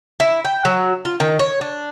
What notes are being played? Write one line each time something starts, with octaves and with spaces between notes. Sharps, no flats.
E4
G5
F#3
F4
D#3
C#5
D4